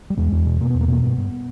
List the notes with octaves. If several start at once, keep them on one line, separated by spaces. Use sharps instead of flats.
G3
E2 G#3
E2
B2
B2 A#3
E2 B3
A#3
B2 A#3 B3
G2 B3
G2